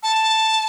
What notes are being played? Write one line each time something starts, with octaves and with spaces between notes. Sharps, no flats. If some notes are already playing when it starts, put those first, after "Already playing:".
A5